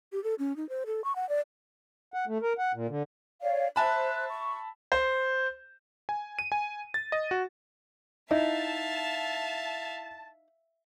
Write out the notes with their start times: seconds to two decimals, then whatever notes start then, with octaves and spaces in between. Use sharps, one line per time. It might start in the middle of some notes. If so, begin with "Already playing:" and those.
0.12 G4
0.24 A4
0.39 C#4
0.56 D#4
0.69 C5
0.86 A4
1.04 C#6
1.16 F#5
1.29 D5
2.14 F#5
2.27 A3
2.42 A#4
2.58 F#5
2.74 A#2
2.89 D3
3.42 C#5 D5 F5
3.76 C5 E5 A5 B5 F#6
4.29 C#6
4.92 C5
6.09 G#5
6.39 D#7
6.52 G#5
6.94 A6
7.12 D#5
7.31 F#4
8.31 D#4 E4 E5 F5 A5